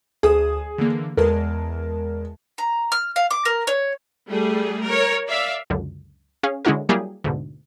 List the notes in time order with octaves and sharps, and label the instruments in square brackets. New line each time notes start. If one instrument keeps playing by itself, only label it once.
[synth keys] D2 D#6 E7 [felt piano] G#4
[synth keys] D3 E3 A#3
[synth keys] E2 G#3 A5 [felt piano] A#4
[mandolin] A#5
F6
F5
D6
A#4
C#5
[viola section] G3 A3 G#4
A#4 C#5
D5 E5 F5
[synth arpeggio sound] C#2 F#2 D3
C#4 G#4 C#5 F5
D3 G#3 C#4 E4 F#4 A#4
F#3 G3 A#3 E4 G4 G#4
D2 G#2 B2